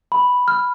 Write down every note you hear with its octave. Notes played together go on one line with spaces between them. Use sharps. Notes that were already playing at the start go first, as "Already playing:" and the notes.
B5
F6